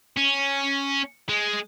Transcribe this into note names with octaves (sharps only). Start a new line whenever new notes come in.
C#4
G#3